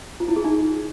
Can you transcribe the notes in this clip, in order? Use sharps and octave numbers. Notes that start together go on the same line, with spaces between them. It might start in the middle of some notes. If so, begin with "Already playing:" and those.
F4
E4
G#4
D#4